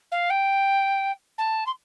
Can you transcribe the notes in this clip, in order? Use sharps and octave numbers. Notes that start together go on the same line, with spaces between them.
F5
G5
A5
C6